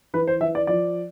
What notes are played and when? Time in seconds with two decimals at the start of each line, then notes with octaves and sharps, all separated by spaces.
0.14 E3 B4
0.27 C5
0.41 E3 E5
0.55 D5
0.67 F3 D5